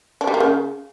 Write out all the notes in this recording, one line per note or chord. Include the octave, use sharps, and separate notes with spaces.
D4
G3
A#3
C#3